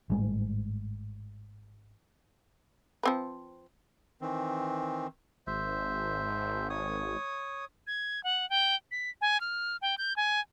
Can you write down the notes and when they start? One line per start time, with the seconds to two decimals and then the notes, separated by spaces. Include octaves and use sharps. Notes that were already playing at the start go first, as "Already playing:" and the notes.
0.10 G#1 A2 G3 G#3
3.03 F3 C4 B4
4.21 D#3 E3 C4
5.47 G#1 C5 E5
6.70 C#5 D#6
7.87 G#6
8.24 F#5
8.50 G5
8.91 B6
9.21 G#5
9.41 F6
9.82 G5
9.98 G6
10.16 G#5